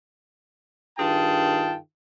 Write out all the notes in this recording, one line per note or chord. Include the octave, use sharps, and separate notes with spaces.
G2 D#3 F4 G#4 G5 A5